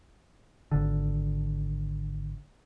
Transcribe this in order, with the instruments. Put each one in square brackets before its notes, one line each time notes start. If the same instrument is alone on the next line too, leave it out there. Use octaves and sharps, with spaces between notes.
[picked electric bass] G#1 D3